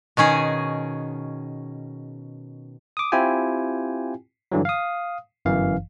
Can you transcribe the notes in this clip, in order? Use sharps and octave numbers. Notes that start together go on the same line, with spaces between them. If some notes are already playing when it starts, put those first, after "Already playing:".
B2 D#3 C#4 G#4
D6 D#6
C4 E4 F4 G4 G5 G#5
G2 D3 E3 F#3
F5 D#6
G1 F#2 E3 F5